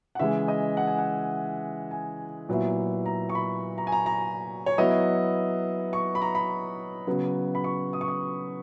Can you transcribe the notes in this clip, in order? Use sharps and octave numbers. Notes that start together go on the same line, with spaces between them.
F#5
C#3 E3 G#3 E5
D#5
F#5
G#5
F#5
G#5
A#2 F#3 B3 E4
A#5
C#6
B5
A#5
G#5
A#5
A#5
C#5
F#3 B3 E4 D#5
C#6
B5
A#5
B5
C#3 F#3 B3
B5
C#6
D#6
C#6
D#6